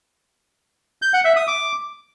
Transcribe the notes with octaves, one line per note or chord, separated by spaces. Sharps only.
G6
F#5
E5
D#6
D6